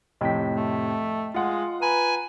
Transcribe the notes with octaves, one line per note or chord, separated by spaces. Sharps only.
F2 A2 C3 D#5 G5 B6
A3
G#3 F4 F#5
B4 G#5 A#5